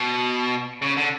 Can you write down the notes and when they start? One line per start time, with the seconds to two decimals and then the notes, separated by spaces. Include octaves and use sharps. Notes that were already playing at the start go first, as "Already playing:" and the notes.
Already playing: B2
0.82 C#3
0.97 D3